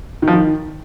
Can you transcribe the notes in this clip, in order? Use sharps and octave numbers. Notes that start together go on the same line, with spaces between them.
D#3
F3
D#3